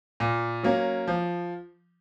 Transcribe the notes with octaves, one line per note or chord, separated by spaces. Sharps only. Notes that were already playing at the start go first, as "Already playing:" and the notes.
A#2
F#3 A#3 C#4
F3